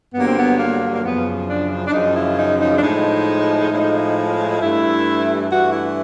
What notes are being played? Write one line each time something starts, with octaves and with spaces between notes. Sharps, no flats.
G2 D3 F#3 A#3 B3
C4
B3
A#3
A#3
F#2 C#3 F3 B3
D4
D4
F#2 C#3 F3 D#4
E4
D#4
D#4
D4
A2 F3 G#3 D#4
A2 F3 G#3
G2 E3 A3 E4
G2 E3 A3 F#4
E4